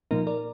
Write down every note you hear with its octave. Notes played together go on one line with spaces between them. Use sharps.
A#2 F3 A#3 D#4 A#4
A#4 D5